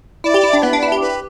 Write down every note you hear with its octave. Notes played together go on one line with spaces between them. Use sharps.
E4 D5
G4
E4
D4
B3 B4
D4
E4
G4
B4